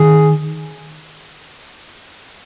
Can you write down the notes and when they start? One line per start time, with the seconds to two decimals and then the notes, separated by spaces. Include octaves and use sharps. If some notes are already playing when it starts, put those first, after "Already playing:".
Already playing: D#3 G#4